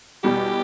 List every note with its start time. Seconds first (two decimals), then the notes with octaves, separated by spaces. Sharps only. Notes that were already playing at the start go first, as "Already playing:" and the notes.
0.24 E2 B2 G3 G4